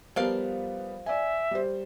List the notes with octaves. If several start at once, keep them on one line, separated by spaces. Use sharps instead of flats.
F3 G3 B3 A#4 F5
D5 E5 G#5
G3 C5